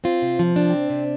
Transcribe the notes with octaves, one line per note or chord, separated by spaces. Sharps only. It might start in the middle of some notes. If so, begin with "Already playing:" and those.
C4 F4
C3
F3
C3 D4
C4
C3